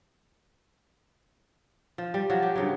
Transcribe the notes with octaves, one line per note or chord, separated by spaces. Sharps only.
F3
G3
F3 F#3 F#4
G4
G2 C#3 F#3